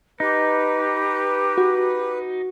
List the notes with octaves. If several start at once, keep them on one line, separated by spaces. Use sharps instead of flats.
D#4 G4 B4
F#4